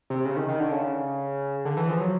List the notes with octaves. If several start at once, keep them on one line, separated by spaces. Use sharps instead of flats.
C3
C#3
D#3
D#3
D3
C#3
D3
E3
F3
F#3